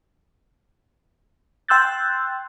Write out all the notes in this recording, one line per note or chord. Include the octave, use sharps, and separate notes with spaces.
G5 C6 E6 F#6 G6 A6